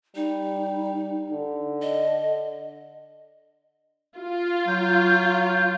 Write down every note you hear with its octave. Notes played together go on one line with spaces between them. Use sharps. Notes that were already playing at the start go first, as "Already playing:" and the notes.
G3 D#4
D3
D#5
F4
F#3 G6